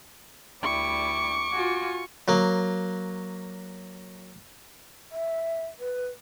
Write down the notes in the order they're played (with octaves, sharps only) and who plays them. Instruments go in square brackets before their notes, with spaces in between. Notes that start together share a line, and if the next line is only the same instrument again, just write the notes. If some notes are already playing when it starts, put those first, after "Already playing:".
[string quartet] D2 G3 E4 [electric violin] C#6 [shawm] D6
[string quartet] F4 F#4 G#5
[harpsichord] F#3 A#3
[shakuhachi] E5
B4